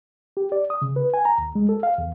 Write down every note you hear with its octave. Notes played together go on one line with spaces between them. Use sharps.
G4
D5
D#6
C#3
B4
G#5
A#5
D#2
G#3
A4
F5
E2